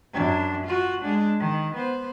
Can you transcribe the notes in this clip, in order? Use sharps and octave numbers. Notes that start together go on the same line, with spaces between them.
F#2 D4
F4 F#4
G#3 D4
D#3
B3 C5